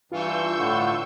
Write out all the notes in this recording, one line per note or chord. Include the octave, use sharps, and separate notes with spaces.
G2 E3 F4 C#6 E6 G6
A2 D3